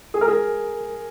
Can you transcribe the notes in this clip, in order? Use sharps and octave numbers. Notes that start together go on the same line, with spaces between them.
G#4
A#4
G#4